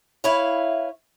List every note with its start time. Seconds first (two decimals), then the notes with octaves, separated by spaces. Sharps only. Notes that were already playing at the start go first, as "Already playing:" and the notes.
0.24 E4 B4 C#5 F5